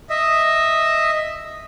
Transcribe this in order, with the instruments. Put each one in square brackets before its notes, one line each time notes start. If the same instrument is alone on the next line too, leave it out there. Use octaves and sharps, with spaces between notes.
[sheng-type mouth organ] D#5 E5